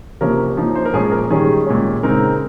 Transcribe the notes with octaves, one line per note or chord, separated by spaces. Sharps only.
C3 F3 A#3 C#4 A#4
F3 A#3 D#4
C5
A#4
A#2 F3 G#3 C#4 G#4
A#4
D#3 G3 C#4 G#4
A#2 G#3 C#4
C#3 G#3 C4 D#4 A#4